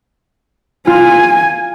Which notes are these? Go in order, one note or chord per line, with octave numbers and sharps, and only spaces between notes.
F4 G#5